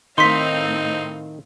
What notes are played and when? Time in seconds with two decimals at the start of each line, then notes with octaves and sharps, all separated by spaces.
0.18 A2 D#3 C4 D#4 F5 C6 B6